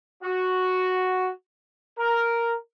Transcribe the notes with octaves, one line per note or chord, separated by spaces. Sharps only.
F#4
A#4